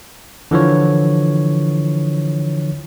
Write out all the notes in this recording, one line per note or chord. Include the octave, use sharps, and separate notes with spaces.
D3 E3 F3 C#5